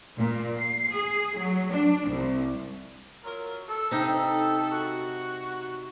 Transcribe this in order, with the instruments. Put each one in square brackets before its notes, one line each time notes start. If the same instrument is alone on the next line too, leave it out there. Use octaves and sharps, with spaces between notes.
[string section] A#2
C7
G#4
F#3
D4
C2
[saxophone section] F#3 F4 A#4
A4
[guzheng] C3 D#4
[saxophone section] F#4